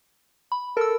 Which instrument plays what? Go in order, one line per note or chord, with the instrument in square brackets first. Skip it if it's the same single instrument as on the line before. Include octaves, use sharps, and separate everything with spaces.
[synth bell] B5
[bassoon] A4 [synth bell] A#4 E6